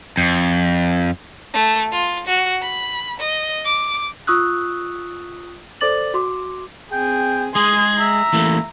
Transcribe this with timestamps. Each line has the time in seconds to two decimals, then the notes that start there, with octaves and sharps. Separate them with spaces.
0.17 F2
1.54 A3
1.92 F4
2.27 F#4
2.62 B5
3.19 D#5
3.65 D6
4.27 F4 C#6 D#6 E6 F#6
5.81 A4 C5 D5 D6 A6 F#7
6.14 F#4 C6 D6
6.92 C4 G#4 G5
7.55 G#3 G#4 C6 D#6 G#6
8.00 E5 A#5
8.33 E3 A3 A#3